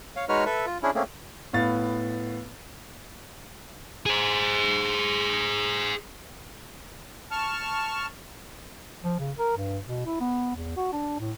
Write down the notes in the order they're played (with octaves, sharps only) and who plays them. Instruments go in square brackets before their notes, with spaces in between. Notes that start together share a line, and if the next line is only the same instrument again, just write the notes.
[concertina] C#5 F5
G#3 D#4 F#4 B4 C#5 F6
A4 B4 E5
F4
C#4 D4 E4 G#4
A3 A#3 C4 C#4 G#4
[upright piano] A2 B3 F5 A6
[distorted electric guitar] G#4 C5
[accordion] A5 C#6 F6
[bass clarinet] F3
C#3
A#4
G2
B2
E4
B3
E2
F#4
D4
A2